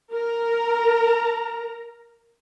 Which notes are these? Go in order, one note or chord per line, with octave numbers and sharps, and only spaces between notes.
A#4 A#5